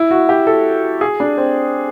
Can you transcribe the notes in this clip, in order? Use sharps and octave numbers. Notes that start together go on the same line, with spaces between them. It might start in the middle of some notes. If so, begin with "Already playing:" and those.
Already playing: E4
F#4
G4
A4
G#4
D4
C4